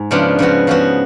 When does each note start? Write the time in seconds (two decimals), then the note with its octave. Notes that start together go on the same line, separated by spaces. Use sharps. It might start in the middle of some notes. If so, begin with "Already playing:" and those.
Already playing: G#2
0.11 C#3 F3 B3 D4 F4
0.39 C#3 F3 B3 F#4
0.67 C#3 F3 B3 F#4